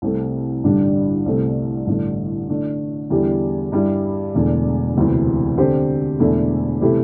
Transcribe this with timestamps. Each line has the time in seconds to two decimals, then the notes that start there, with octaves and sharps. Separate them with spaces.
0.02 C2 C3 A3
0.64 A1 G2 D3 G3 D4
1.26 C2 C3 A3 C4
1.87 A1 G2 D3 A3 D4
2.49 D3 A3 D4
3.10 E2 D3 G3 E4 G4
3.72 G2 G3 E4
4.34 E1 E2 D3 A3
4.96 E1 D2 C3 E3
5.58 D3 C4 G4 C5
6.19 E1 E2 D3 A3 E4
6.81 C3 E3 A3 E4 G4